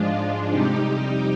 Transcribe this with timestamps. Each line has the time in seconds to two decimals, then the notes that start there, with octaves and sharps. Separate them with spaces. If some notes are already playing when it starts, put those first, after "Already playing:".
Already playing: G#2 F3 G#3 D4 F4
0.50 F2 C3 G3 D#4 G4